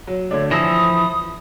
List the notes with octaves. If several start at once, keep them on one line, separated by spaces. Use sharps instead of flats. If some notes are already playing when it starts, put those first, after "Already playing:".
F#3
D3 A3 D4 C#5
E3 F3 A4 D#6 A#6